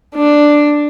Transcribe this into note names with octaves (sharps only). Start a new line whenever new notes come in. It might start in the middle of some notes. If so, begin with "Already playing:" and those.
D4